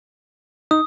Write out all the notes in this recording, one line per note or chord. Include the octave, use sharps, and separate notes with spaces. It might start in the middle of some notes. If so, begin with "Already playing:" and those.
D#4 D#6